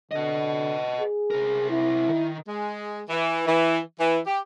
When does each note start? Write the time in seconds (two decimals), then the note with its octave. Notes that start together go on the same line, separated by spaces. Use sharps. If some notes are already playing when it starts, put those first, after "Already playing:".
0.11 D3 B4 D#5
1.01 G#4
1.31 C3 A#4
1.70 E4
2.09 D#3
2.48 G#3
3.09 E3
3.47 E3
4.00 E3
4.27 G4